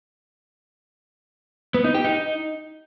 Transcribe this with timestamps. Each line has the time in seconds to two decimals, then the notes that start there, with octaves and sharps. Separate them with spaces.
1.74 B3
1.84 D#4
1.95 G4
2.05 D#4